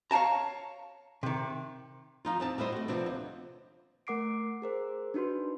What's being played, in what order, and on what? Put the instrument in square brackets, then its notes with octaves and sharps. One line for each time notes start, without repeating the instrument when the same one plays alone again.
[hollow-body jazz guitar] C#5 F5 G5 A5 A#5
C3 D#3
[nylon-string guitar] F3 D#4 F4
E2 C4 A5
G3 B3 E4 C5 D#5
A3 F#4
C3 F3 B3 C4 D4
D#2
[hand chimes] A3 A#4 F#5 D6 C7 D7
G#4 A#4 C5
D4 D#4 F#4 B4 C6